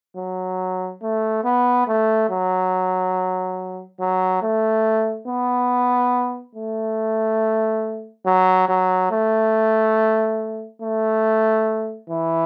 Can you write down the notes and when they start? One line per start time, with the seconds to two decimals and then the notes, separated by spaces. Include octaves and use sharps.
0.17 F#3
1.02 A3
1.45 B3
1.87 A3
2.30 F#3
4.00 F#3
4.43 A3
5.28 B3
6.56 A3
8.26 F#3
8.69 F#3
9.11 A3
10.82 A3
12.10 E3